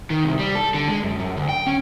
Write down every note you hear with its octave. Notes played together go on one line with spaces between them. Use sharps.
D#3
C2
G3
A4
D3
G#3
F#2
F#2
D2
G5
C#4